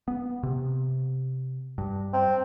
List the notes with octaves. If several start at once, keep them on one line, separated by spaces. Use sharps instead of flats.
B3
C3
G2
C4